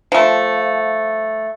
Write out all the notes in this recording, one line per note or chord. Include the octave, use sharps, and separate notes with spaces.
F3 A3